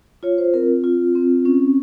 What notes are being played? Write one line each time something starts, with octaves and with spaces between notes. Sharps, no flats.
F4 C#5
C5
C4 A#4
F4
C4
C#4